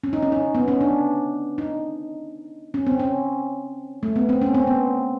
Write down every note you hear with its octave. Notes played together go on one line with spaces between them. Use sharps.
C#4
D#4
C#4
D#4
B3
C#4
D4
D#4
C#4
C4
C#4
A3
B3
C4
C#4
C4
B3